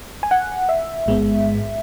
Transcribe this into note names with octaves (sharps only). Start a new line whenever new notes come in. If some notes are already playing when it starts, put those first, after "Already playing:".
G#5
F#5
E5
A1 G#2 G#3 B3